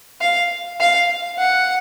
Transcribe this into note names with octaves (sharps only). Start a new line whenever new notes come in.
F5
F5
F#5